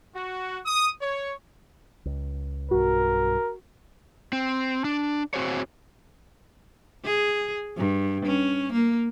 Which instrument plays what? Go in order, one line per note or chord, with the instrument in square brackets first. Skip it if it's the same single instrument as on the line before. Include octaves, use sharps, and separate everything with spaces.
[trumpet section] F#4
D#6
C#5
[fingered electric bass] C#2
[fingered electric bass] B1 G2 [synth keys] F#4 [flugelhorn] A#4
[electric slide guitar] C4
D4
C4 F#4 G#4 C5 C#5
[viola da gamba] G#4
G2
C#4
A#3